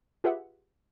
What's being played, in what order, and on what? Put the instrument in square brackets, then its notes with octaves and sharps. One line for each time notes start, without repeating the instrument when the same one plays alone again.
[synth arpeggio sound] F4 G4 G#4 B4 E5 F#5